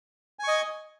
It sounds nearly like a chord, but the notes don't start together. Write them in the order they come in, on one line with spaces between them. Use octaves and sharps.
G#5 C#6 D#5